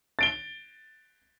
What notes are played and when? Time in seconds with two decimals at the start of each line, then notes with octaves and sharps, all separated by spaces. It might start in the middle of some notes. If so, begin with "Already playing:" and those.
0.19 A6 D7 G7